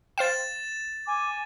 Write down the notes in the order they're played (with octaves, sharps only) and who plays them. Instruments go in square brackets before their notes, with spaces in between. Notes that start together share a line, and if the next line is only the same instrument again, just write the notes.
[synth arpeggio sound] C5 F5 G5 [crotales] A6 E7
[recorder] G#5 [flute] D6